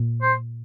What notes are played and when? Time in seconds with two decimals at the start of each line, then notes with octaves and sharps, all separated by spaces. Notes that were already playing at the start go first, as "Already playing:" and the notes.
Already playing: A#2
0.22 C5